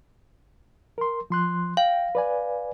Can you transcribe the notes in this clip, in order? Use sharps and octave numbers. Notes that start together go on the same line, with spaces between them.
A#4 C6
F3 C6 F#6
F5 G5
B4 D5 G#5